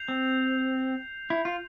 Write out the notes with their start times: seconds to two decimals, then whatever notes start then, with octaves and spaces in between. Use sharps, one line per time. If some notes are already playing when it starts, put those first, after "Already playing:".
Already playing: G6 C7 F7
0.08 C4
1.30 E4
1.45 F4